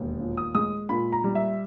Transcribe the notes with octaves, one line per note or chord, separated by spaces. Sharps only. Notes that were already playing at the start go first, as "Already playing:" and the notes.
Already playing: E1 D#2
A#2
D#6
G#3 D#6
A#2 B5
A#5
G3
E5